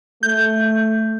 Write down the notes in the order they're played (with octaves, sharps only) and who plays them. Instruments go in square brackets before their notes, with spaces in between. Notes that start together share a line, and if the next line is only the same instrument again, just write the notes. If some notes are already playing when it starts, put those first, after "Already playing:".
[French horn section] A3 [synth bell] G6